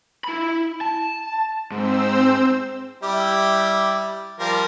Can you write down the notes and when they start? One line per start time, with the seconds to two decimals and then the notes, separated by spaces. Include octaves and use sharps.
0.24 E4 B5
0.81 A5
1.71 G#2 C4 C5 E6
3.03 G3 E4 G4
4.40 F3 G3 A#4